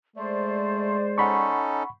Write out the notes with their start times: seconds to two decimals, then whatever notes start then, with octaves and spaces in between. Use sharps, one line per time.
0.16 G#3 A3 C5 D5
1.18 C#4 D#4 A4 F#5 B5 C#6